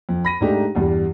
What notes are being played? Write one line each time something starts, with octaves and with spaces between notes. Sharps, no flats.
F2
B5 A#6 D#7
G#2 G#3 A3 D4 D#4 G4
E2 G2 G3